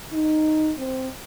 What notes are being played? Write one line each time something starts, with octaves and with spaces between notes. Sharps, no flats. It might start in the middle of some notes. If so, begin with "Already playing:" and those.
D#4
C4